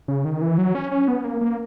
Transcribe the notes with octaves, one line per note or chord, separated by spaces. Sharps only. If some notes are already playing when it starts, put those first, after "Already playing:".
C#3
D#3
E3
F#3
C#4
C#4
B3
A#3
A#3